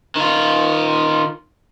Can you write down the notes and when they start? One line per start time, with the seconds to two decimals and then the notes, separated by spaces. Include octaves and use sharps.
0.16 D#3 F4